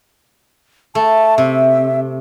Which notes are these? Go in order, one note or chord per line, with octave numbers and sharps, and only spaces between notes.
A3 A5
C3 E5